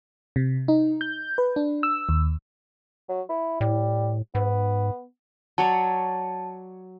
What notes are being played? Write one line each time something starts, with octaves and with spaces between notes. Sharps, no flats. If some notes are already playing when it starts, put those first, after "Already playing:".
C3
D#4
G6
B4
D4
E6
D#2
F#3
E4
A2 G3
G#2 B3
F#3 C#5 D5 A5